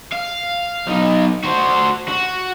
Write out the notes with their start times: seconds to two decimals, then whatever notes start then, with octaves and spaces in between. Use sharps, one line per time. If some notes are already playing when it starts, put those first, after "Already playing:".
0.12 F5
0.87 B1 D#4
1.44 F#4 C5
2.08 F#4